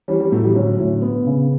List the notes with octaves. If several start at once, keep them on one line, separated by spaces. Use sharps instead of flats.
E3 G3 C#4
E3 G3
A2 F#3 A3
E3 G3
D3 F#3 C#4
A2
B3
C#3